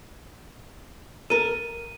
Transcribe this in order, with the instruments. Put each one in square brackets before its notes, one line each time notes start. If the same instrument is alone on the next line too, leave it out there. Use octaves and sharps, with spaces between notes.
[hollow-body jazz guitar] A4 A#4 [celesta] D#7